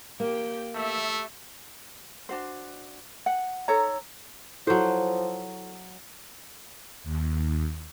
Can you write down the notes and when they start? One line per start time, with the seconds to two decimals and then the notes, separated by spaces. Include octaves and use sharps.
0.20 A#3 G4 G5
0.76 A3 G4 E5
2.29 D4 F#4 C5
3.26 F#5
3.68 D#4 A4 C#5 A#5
4.67 F3 F#3 E4 A4 C5
7.03 D#2